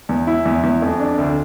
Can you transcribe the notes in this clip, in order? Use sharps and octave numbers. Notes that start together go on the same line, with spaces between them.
E2
E4
E2
E2
F2
D4
D2